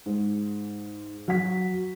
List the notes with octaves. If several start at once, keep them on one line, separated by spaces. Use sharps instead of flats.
G#2
F#3 F#5 B6